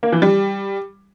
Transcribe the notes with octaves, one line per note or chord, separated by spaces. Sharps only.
A#3
E3
G3